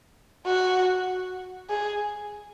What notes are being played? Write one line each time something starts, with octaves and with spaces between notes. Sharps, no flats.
F#4
G#4